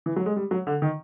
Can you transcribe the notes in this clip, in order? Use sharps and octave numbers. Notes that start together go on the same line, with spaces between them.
E3
F#3
G#3
G3
F#3
D3
D#3